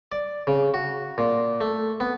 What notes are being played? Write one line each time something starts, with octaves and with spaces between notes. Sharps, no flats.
D5
C#3
F#4
A#2
A3
B3